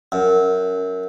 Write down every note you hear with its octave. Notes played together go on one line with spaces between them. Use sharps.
F#2